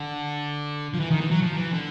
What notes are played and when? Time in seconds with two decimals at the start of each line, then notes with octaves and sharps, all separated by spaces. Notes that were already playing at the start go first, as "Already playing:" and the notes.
Already playing: D3
0.94 F3
1.00 E3
1.11 D#3
1.21 E3
1.31 F#3
1.42 F3
1.57 E3
1.73 D3